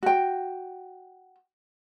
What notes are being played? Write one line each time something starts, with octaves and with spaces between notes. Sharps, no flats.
F#4 G5